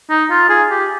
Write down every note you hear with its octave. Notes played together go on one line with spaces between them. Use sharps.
D#4
F4
G#4
G4